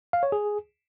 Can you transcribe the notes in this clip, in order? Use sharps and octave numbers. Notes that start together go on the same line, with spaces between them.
F5
C#5
G#4